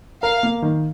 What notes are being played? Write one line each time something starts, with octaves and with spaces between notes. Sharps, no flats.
A#4 F5
A#3
D#3